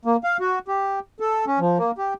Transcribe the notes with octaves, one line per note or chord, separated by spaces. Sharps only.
A#3
F5
F#4
G4
A4
C#4
F3
A#3
G4